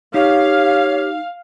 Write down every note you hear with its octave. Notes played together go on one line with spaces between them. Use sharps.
D#4 G4 C#5 F5